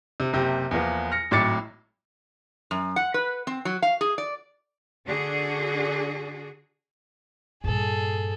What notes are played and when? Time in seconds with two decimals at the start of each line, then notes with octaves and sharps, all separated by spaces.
0.20 C3
0.33 F#1 C3 G4
0.71 E2 F3 A#3 B3
1.11 F6 A#6 C#7
1.31 G#1 A2 F#3 D6 A6 C#7
2.71 F#2
2.96 F#5
3.14 B4
3.47 C4
3.65 F#3
3.82 F5
4.01 G#4
4.18 D5
5.05 D3 D4 F#4 G#4
7.64 G2 A#2 G#4 A4